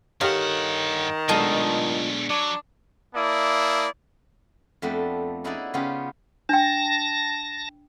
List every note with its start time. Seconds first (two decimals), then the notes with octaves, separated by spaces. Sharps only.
0.21 G2 D#3 G4 A4 C#5 F5 F#5
1.29 B2 F#3 G#3 A3 D4 F4 A4 D#5
2.30 F#3 D4
3.15 A#3 E4 D5 E5 A5 D#6
4.82 F2 A3 B3 D4 G5
5.44 C#4 D#4 E4 F#4 G#4 D5
5.74 C#3 B3 C#4 F4 G4
6.49 D4 G5 A5 A#6